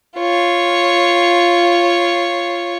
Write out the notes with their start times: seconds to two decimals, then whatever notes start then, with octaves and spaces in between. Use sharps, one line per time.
0.18 F4 C#5